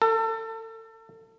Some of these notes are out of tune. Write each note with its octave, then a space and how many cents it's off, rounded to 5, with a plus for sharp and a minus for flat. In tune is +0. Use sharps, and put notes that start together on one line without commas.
A4 +35